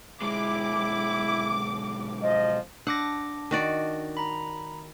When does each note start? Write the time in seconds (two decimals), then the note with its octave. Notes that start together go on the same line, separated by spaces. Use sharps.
0.22 B1 G#3 E4 D6
2.22 F3 D#5
2.87 D4 F#5 D6 A#6
3.51 D#3 F#4 D5
4.17 A#5 B5